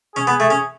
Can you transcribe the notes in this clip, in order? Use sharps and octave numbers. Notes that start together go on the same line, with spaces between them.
C#4 G#4
B3
A3
C#4